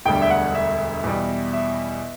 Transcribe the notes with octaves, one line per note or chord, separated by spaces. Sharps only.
E1 D2 D3 G3 G5
E5
F#5
E5
E2 B2 G3
E5